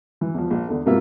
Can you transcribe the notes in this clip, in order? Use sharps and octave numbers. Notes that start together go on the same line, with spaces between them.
E3
E2 F3
A#1
E2 D3
G#2 C3 A#3 B3 F4 E5